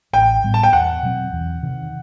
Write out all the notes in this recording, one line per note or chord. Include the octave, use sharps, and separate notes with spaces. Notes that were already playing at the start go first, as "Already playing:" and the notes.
A1 G5
A2 G3 B3
A5
G5
E2 F#5
B2 F#3 C4
E2
C3 D#3